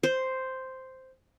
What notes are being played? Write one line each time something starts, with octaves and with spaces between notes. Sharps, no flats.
C5